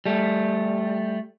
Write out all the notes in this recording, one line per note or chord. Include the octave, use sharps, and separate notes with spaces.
G3 A3